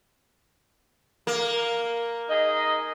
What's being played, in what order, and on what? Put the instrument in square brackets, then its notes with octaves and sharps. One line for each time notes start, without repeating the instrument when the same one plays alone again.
[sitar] A#3
[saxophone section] D#4 G#4 D#5